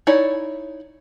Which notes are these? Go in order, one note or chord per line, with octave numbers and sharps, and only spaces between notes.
D#4 E4 C#5 D5